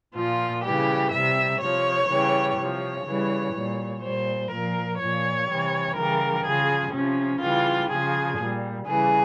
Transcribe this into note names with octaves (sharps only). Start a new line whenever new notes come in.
A#2 F3 F4
C#3 E3 G3 G4
C3 G3 E5
C3 F3 C#5
C#3 E3 G3
C3 F3 C#5
C#3 E3 G3
A#2 G3
A#2 G3 C5
A#2 F3 A#4
A#2 F3 C#5
C3 E3 G3
C#3 E3 G3 A#4
C#3 F3 G#4
C3 F3 C#4
C#3 E3 G3 F4
C#3 F3 G#4
A#2 G3
C#3 E3 G3 G#4